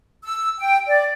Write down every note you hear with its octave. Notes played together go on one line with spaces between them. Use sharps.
E6
G5
D5